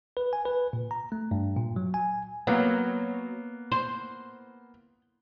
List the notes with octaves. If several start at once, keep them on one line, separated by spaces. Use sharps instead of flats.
B4
G#5
B4
A#2
A#5
A3
G2
A#2
F#3
G#5
F#3 A#3 B3
C5